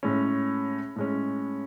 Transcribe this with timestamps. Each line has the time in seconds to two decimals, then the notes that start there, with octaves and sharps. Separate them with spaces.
0.03 A2 G#3 C#4
0.96 A2 G#3 C#4